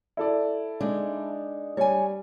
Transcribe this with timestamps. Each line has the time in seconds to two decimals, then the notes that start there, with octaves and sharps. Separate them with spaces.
0.17 E4 A4 D5
0.80 G#3 D4 D#4
1.77 G3 C#5 G#5